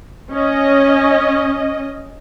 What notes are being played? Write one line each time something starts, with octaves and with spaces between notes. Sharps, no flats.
C#4 D#5